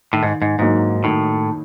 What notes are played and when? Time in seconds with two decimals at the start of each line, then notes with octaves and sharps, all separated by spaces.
0.13 A2 D#3
0.23 G#2
0.42 G#2
0.59 G#2 F#3 A#3 D#4
1.04 A2 D#3